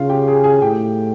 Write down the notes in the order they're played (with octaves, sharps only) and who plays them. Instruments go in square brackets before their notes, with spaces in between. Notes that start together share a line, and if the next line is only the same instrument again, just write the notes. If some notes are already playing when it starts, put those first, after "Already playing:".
Already playing: [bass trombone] C#3 [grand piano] F4 F5
[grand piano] G4 G5
G#4 G#5
G#4 G#5
[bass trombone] A2 [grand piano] G4 G5